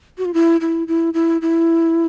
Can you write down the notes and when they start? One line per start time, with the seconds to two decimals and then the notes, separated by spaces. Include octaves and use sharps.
0.18 F#4
0.25 F4
0.34 E4
0.61 E4
0.88 E4
1.14 E4
1.41 E4